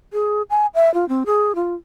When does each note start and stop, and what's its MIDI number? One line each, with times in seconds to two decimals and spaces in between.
0.13 0.42 68
0.50 0.66 80
0.74 0.92 76
0.94 1.08 65
1.09 1.24 60
1.26 1.55 68
1.55 1.74 65